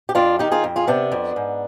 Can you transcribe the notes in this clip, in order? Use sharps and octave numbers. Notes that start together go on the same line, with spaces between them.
G4
F2 D4 F4
D#3 D#4 G4
F4 G#4
F2
F4 G#4
C3 B3 D4
F2
G#2